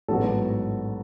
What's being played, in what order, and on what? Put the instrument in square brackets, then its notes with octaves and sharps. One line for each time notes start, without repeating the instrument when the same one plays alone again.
[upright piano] A1 G#2 F#3 B3 F#4 A4